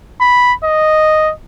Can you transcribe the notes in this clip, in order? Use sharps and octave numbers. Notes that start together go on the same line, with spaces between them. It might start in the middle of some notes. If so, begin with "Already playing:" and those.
B5
D#5